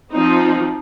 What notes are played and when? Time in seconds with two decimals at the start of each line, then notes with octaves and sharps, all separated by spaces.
0.13 F3 C4 D#4